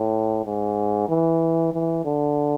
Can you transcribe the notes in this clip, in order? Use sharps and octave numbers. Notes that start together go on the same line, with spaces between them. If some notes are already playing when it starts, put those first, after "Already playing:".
Already playing: A2
G#2
E3
E3
D3